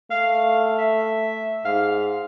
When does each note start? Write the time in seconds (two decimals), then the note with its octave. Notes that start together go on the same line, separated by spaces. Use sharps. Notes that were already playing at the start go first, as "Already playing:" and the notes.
0.11 A3 F5
0.79 E5
1.65 G#2 F5